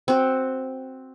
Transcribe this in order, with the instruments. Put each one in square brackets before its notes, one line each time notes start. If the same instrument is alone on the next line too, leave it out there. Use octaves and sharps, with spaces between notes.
[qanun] C4 F#4